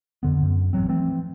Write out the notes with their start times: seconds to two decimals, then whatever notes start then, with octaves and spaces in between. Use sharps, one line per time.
0.23 F2 D3 B3
0.42 F#2
0.73 A1 D3 F#3 C4
0.88 E3 F3 A3 C4